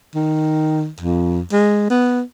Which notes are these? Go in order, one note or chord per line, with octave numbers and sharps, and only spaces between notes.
D#3
F2
G#3
B3